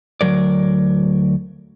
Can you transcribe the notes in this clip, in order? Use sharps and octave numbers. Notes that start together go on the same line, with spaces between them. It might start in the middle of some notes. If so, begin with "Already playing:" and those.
D2 F#3 A#4 D5